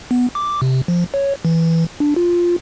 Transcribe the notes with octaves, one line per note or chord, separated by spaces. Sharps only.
B3
D6
C3
F3
C#5
E3
D4
F4